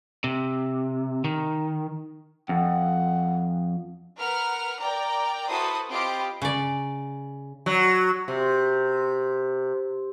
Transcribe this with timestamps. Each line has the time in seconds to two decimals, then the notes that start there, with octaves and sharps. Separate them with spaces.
0.24 C3
1.24 D#3
2.49 F2 F#5
4.18 A#4 B4 F#5 F6
4.80 A#4 D5 G5 A#5
5.49 E4 F#4 A4 B4 C5 D#6
5.90 C4 F4 G4 D#5 B5 D7
6.42 C#3 D5
7.66 F#3
8.28 C3